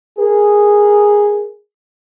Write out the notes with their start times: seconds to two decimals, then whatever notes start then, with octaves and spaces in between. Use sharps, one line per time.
0.18 G#4 A#4